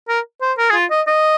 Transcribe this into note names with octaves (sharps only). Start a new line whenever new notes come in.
A#4
C5
A#4
G#4
F4
D#5
D#5